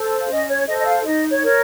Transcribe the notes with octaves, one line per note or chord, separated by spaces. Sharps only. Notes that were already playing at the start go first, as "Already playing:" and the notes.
Already playing: A4 C5
F5
C#4 D#5
C#5
A4 C5 D#5
D#5
F5
D#4 D#5
C#5
A#4 C#5